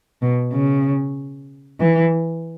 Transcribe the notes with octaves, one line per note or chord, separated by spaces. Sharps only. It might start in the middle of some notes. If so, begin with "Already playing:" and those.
B2
C#3
E3